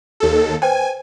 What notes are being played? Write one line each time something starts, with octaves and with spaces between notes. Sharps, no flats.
D#2 A4
B4 C5 G5 G#5